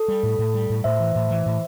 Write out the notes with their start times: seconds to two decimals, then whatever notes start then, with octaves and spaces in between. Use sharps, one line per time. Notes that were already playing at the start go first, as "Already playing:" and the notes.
Already playing: A4
0.08 G3
0.23 A2
0.39 A2
0.54 G3
0.70 A2
0.84 A2 C5 E5
1.00 E3
1.15 A2
1.31 E3
1.46 A2